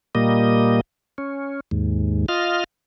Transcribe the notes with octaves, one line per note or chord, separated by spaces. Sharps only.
A#2 G3 A#3 D#5
C#4
D#2 G#2
F4 D#5 F6